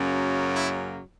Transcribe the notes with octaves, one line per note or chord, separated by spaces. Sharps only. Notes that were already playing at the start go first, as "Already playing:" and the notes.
Already playing: F#2 C#3 F#3 A#3
E4